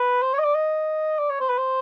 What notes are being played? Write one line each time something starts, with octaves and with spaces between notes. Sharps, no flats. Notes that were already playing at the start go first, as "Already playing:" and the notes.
Already playing: B4
C5
C#5
D#5
D5
D#5
D5
C#5
C5
B4
C5